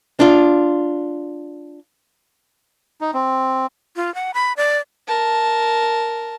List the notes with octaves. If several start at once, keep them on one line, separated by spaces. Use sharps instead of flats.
D4 F4
D#4
C4
F4
F#5
B5
D5
A#4 A5